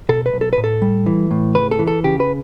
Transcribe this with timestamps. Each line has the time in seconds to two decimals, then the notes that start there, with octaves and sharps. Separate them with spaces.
0.09 B2 A4
0.26 B4
0.33 B1
0.41 A4
0.53 A2 B4
0.64 A4
0.82 G3
1.06 E3
1.31 A2
1.55 C#2 B4
1.71 A4
1.79 E3
1.87 A4
2.04 C#3 G4
2.20 B4